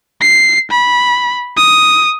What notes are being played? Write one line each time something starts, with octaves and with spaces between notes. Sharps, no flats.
C7
B5
D#6